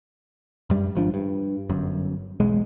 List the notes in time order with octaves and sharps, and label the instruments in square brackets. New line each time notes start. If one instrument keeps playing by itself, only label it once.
[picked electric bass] F#2 G3
G#1 F3 D4
G2
G1 F#2
E1 B1 G#3